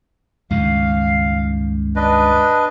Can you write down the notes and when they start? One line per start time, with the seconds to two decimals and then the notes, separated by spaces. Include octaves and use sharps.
0.51 C#2 G2 D#3 F5
1.96 D4 B4 D#5